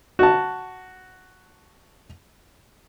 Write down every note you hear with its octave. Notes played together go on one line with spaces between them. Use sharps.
F#4 A5